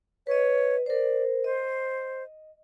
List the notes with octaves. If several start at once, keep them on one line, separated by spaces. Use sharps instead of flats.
B4 C#5 D#5
A#4 C5 D5
C5 D#5